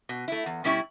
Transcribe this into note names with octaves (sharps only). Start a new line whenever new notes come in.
B2
A3 E4
E2
B2 G3 C#4 E4